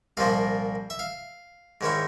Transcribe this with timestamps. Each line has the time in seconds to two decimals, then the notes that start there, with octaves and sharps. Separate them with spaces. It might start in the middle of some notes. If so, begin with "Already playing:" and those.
0.17 C2 A#2 F3 A#3 F5
0.90 E5
0.99 F5
1.81 G#2 D#3 G#3 C#4 E4